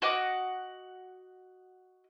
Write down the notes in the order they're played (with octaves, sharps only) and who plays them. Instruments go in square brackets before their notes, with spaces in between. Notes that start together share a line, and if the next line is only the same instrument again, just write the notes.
[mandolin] F#4 D#5 F#5 D6